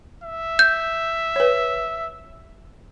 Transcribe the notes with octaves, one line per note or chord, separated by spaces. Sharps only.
E5
G6
B4 C#5